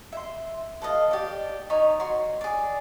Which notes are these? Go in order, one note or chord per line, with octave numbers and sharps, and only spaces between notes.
E5 C6
A4 B4 D#5 F5
G4 D5
D#4 C#5 B5
F#4 C6
G#4 D5